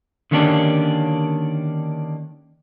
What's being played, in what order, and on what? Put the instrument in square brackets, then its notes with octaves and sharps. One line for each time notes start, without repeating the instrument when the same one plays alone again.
[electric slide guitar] D3 D#3 A#3 C#4 D4 G4